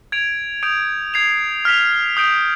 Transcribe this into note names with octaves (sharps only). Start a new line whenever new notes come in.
G#6 D7 F7
D#6 G6 D7 F7
G#6 C7 F7
F6 B6 F7
D#6 G6 D7 F7